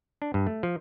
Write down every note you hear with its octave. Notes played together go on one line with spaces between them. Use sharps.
D4
G2
A3
F3